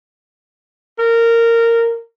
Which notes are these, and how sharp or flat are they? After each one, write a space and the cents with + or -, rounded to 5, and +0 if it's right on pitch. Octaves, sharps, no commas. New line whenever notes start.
A#4 -15